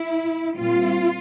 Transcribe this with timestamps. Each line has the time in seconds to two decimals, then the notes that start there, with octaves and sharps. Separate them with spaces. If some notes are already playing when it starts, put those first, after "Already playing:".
Already playing: E4
0.58 A#2 G3 C4 F4